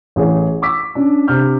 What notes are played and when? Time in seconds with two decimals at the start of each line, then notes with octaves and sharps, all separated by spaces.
0.16 A1 G#4 C#5
0.62 C#6 D6 E6 B6
0.95 C#4 D4
1.28 C3 D4 F6 G6